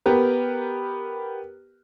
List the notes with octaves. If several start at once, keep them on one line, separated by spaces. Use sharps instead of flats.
B3 G4 A#4 B4